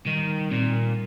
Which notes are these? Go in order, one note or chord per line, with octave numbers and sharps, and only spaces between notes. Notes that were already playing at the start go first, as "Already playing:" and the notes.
D#3 G3
A#2 C4